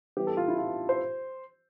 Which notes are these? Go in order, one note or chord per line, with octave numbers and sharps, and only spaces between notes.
E3 G3 B3 G4
A4
F4
E4
F4
C5